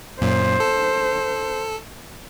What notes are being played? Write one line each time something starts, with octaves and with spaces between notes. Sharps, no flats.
F#2 A#2 C5
A4